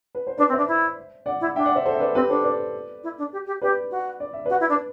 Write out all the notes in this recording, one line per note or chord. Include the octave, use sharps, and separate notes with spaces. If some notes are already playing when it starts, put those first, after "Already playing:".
B4
C5
D4 B4 D5
C4
D4 C5 E5
E4
D5 F#5
E4
D4 E5 G5
D5 F#5
C5 E5
A4 C5
E5
B4 D5
C4 G4 B4
D4 A4 C5
B4 D5
E4
D4
G4
G4
G4 B4 D5
F#4
D5
E5
F#4 B4 D5
E4
D4
B4